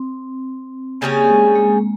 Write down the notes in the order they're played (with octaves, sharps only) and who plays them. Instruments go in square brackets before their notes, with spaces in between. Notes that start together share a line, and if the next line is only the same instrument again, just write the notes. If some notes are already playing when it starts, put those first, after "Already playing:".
Already playing: [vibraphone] C4
[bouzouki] C#3 G3 C#4 G#4 [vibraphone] A#3
[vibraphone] G#3
G#3